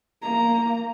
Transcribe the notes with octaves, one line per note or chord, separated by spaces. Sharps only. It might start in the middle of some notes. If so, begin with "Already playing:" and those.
A#3 A#5